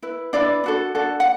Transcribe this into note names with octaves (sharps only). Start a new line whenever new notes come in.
E4 B4
D4 E4 B4 D5
D4 F#4 A4
D4 F#4 A4
F#5